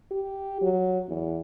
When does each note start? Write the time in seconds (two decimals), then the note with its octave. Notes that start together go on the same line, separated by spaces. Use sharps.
0.11 G4
0.62 F#3
1.08 E2